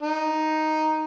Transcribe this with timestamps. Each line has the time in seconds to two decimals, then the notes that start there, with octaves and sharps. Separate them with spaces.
0.03 D#4